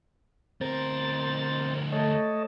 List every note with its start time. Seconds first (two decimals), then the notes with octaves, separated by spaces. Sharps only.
0.61 D2 C4 A#4 C5 A6
1.92 A3 C#5 D#5 A5